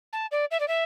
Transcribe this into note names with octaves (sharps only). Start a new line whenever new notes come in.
A5
D5
E5
D5
E5